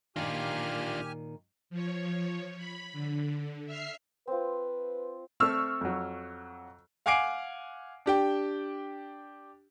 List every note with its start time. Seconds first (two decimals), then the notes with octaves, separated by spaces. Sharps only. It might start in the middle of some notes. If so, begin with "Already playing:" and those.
0.16 A#2 D#3 D4 F4 G4 G#5 F6
1.70 F3 C#5
2.58 B5
2.93 D3
3.66 E5 F6 C7
4.27 C4 F4 B4
5.40 A3 C4 C#6 E6 F6
5.81 F2 F#3
7.06 F5 F#5 G#5 D6 C7 D7
8.06 D4 G4 G5